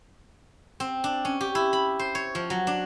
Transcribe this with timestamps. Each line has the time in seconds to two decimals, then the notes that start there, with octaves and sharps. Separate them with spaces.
0.80 C4
1.04 D4
1.25 C#4
1.41 G4
1.55 E4
1.73 B5
1.99 C5
2.15 C#5
2.35 F3
2.50 F#3
2.67 D4